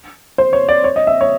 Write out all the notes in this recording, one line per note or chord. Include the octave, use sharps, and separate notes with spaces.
C5
C#5
D5
C#5
D#5
E5
C#5